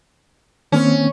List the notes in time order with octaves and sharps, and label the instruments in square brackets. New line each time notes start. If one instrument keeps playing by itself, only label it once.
[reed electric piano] D#3 A#3 C4 [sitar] C#4